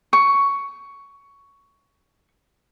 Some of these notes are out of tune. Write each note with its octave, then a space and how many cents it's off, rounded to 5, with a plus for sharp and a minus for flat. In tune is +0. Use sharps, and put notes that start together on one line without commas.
C#6 +10